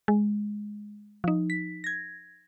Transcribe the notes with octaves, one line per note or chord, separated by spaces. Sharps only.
G#3
F3 D#4
B6
G#6 A#6